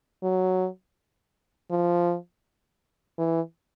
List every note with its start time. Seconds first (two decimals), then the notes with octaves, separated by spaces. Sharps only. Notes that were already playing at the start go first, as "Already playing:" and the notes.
0.23 F#3
1.71 F3
3.18 E3